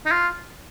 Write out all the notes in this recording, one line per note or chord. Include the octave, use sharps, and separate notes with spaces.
D#4
F4